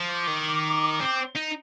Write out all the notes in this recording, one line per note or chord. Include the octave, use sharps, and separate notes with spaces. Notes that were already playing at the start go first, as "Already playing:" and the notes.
Already playing: F3
D6
D#3
C4
D#4